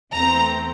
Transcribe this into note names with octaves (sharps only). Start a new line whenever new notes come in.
E2 E3 A3 C4 A#5